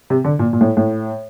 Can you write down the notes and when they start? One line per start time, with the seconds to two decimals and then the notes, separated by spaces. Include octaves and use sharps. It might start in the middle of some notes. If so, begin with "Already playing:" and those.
0.10 C3
0.25 D3
0.39 A#2
0.53 A#2
0.61 A2
0.77 A2